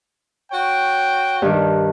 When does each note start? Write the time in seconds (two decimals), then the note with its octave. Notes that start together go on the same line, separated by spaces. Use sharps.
0.52 F#4 C#5 G5
1.42 G2 D#3